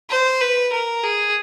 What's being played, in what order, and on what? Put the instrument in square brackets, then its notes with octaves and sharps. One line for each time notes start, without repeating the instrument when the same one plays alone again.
[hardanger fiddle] C5
B4
A#4
G#4